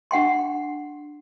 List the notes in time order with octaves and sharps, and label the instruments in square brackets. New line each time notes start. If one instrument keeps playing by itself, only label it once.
[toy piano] D4 F#5 G5 C6